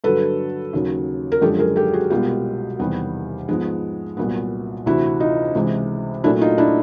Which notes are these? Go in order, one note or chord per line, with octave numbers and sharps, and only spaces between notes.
G2 D3 F#3 A4 B4
D#2 C#3 F#3
A#4
F#2 D3 F3 G#3 G4 A4
G#4 A#4
G4 A4
F#4 G#4
C2 B2 G#3 B3 F4 G4
E2 C3 D#3 G3 B3
G#2 F3 G#3 B3
C2 A#2 F#3 B3
D2 C3 E3 E4 F#4
D#4 F4
C#2 C3 E3 G#3
A#2 F#3 A3 D4 E4
D#4 F4
D4 E4